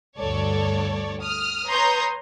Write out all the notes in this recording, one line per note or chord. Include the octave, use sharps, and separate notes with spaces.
D2 G2 A4 C#5 D5
D#6 F6
B4 C#5 A#5 C6 D#6 G6